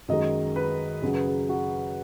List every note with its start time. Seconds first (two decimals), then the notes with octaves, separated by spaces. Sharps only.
0.08 F#2 D#3 G#3 D#5
0.56 B4
1.02 F#2 C#3 F#3 G#4
1.14 B4
1.27 G#4
1.49 F#4